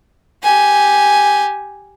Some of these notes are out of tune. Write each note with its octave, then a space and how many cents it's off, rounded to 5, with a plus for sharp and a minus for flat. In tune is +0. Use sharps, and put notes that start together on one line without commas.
G4 +0 G#5 +0